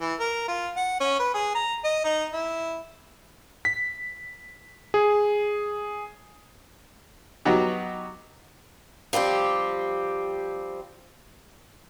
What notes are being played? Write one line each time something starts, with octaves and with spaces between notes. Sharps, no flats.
E3
A#4
F4
F#5
C#4
B4
G#4
A#5
D#5
D#4
E4
B6
G#4
F#3 B3 D#4 F#4 G4
F3 G3 C4 G4